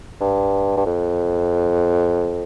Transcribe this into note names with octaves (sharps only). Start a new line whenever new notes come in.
G2
G2
F2